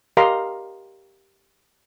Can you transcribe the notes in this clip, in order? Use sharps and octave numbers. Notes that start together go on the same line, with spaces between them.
G4 A#4 D#5 F5 A#5 C6